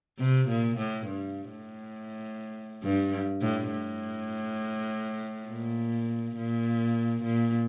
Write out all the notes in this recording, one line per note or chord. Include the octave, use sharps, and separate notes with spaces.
C3
A#2
A2
G2
A2
G2
A2
A2
A#2
A#2
A#2